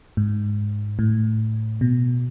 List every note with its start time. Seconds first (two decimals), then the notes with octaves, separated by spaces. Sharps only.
0.17 G#2
0.99 A2
1.81 B2